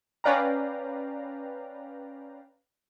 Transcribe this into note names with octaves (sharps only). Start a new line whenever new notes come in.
C#4 B4 D5 F5 G5 A#5